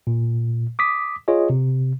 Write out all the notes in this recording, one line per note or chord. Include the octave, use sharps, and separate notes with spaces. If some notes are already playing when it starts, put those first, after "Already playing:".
A#2
D6 D#6 B6
F4 G#4 C#5 D#5
C3